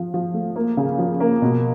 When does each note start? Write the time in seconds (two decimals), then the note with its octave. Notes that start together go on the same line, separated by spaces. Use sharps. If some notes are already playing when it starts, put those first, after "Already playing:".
Already playing: F3
0.14 F3
0.34 A3
0.56 A#3
0.77 C#3
0.99 F3
1.20 A#3
1.42 B2